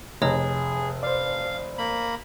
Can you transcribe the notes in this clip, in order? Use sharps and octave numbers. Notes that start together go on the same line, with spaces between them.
F1 G#4 C#5 D#5 A#5
C5 D5 F5
A#3 B5